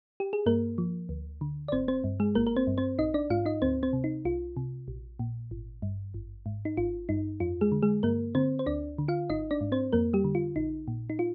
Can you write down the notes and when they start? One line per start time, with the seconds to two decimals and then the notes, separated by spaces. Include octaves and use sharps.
0.20 G4
0.33 G#4
0.46 G2 A#3 A#4
0.78 F3
1.09 D2
1.41 D3
1.68 D5
1.72 G#1 C4 C5
1.88 C4 C5
2.04 G2
2.20 G#3 G#4
2.35 G#1 A#3 A#4
2.47 A#4
2.56 C4 C5
2.67 G2
2.78 C4 C5
2.99 A#1 D#4 D#5
3.14 D4 D5
3.30 G#2 F4 F5
3.46 D#4 D#5
3.62 D2 C4 C5
3.83 C4 C5
3.93 C3
4.04 D#4
4.25 C2 F4
4.57 C3
4.88 A#1
5.19 A#2
5.51 G#1
5.82 G2
6.14 G#1
6.46 G#2
6.65 D#4
6.77 G#1 F4
7.09 G2 D#4
7.40 F2 F4
7.61 G#3 G#4
7.72 D3
7.82 G#3 G#4
8.03 G2 A#3 A#4
8.35 D3 C4 C5
8.59 C5
8.66 D2 D4 D5
8.98 D3
9.08 F4 F5
9.30 G#1 D#4 D#5
9.51 D4 D5
9.61 G#2
9.72 C4 C5
9.92 F2 A#3 A#4
10.13 G3 G4
10.24 D3
10.35 F4
10.56 A#1 D#4
10.88 A#2
11.10 D#4
11.19 F4